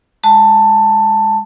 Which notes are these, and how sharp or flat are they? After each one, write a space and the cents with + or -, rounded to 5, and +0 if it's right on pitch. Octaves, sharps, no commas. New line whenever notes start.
G#3 -20 A5 +10